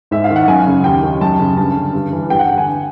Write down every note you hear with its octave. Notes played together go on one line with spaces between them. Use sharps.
G#2 E5
F5
D#3
F#5
F#2 G#5
C#3
D#2 G5
D#3
F#2 A5
C#3
G2 A5
D3
G2
E3
G2 G5
F#5
D3 G5
G#5